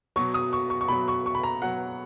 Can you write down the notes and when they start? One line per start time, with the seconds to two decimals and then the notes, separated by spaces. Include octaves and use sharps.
0.16 B2 F#3 C#6
0.34 D#6
0.53 C#6
0.70 C#6
0.81 C#6
0.88 B2 F#3 B5
1.08 C#6
1.26 C#6
1.35 B5
1.44 A#5
1.62 B2 F#3 F#5